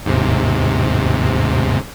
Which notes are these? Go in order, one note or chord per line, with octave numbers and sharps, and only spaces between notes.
D#2 G#2 C3